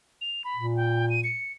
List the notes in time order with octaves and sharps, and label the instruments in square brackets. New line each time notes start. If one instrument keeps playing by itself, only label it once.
[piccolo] F7
B5
[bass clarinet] A#2
[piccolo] G5
D#7
C#7